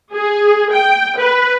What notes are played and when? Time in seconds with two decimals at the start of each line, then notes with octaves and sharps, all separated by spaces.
0.13 G#4
0.71 G5
1.17 B4